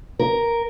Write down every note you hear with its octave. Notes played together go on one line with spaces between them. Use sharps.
A#4